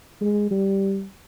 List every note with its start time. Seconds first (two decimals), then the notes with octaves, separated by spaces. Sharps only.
0.21 G#3
0.51 G3